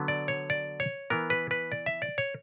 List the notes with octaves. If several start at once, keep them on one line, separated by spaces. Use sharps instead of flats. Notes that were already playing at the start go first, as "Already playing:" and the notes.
Already playing: D3 F#3 B3
D5
C#5
D5
C#5
E3 B3 A#4
B4
B4
D5
E5
D5
C#5